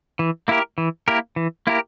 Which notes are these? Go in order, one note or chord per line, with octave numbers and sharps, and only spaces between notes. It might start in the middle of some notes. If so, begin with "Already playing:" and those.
E3
A#3 E4 G4 A#4
E3
A#3 E4 G4 A#4
E3
A#3 E4 G4 A#4